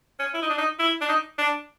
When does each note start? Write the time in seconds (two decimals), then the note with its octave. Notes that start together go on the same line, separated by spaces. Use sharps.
0.19 C#4
0.34 E4
0.42 D#4
0.49 D4
0.58 D#4
0.79 E4
1.01 D4
1.09 D#4
1.38 D4